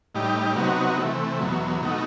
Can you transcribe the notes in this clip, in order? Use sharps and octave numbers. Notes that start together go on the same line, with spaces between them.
A2 G3 D#4 G4
C3 F#3 B3 D#4 F#4
C3 E3 A3
E2 B2 F#3
B2 A3 D#4 F#4